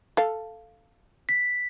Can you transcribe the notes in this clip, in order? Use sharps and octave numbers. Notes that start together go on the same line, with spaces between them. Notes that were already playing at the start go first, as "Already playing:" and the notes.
A4 F5
B6